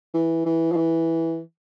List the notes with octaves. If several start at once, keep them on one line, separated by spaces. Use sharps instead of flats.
E3
E3
F3
E3